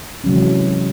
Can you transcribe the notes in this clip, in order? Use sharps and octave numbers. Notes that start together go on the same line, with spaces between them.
C3 E3 F#3 G#3 C#4